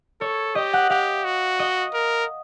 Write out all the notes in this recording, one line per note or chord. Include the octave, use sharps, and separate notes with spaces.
A4 C#5
G4 D#5
F#5
G4 F5
F#4
D#5
A#4